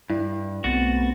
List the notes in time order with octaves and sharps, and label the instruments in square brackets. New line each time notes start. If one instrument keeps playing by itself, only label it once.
[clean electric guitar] G2 [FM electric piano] E4
[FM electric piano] B1 A6 [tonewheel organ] A3 B3 C4 [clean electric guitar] F#4